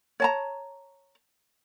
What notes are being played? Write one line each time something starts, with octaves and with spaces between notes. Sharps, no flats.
C#5 A5 A#5